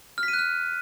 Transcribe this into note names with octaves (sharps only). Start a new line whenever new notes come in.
F6
B6
D#7
F#6
F6